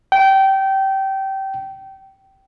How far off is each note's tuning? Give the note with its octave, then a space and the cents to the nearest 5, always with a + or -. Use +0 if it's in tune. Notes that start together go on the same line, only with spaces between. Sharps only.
G5 -20